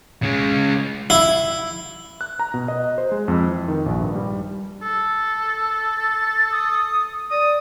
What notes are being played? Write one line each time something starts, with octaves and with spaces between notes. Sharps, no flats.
C#3 G#3
E4
F#6
A#5
B2
D#5
C5
G#3
F2
E3
D#3
A#1
G2
G3
A4
A6
D#6
D5 D#6